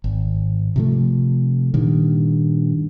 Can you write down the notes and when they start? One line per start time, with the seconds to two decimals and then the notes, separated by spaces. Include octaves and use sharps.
0.04 G#1
0.76 C3 F3 A3
1.74 G2 A#2 D#3